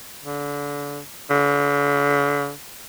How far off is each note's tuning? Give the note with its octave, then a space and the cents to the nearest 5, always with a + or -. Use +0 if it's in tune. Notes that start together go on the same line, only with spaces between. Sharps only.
D3 -30
D3 -45